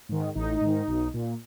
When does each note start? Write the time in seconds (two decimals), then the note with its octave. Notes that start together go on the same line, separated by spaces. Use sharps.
0.09 G#2 D#3
0.35 A1 D#4
0.61 G#2 D#3
0.88 B1
1.14 A#2